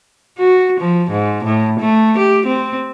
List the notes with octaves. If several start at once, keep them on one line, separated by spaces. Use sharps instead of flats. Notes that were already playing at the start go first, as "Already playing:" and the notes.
F#4
F3
G#2
A2
A3
G4
C4